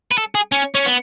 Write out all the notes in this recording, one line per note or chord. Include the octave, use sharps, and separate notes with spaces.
B4
A4
G#4
C#4
C#4
B3